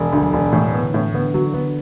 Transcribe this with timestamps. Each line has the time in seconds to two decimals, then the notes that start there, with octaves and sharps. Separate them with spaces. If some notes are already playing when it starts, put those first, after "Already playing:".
Already playing: E1
0.13 D2
0.22 F#3
0.33 E1
0.52 A2 E3
0.74 B3
0.84 D3
0.94 A2
1.13 D3 B3
1.34 D3 F#3
1.54 D3 B3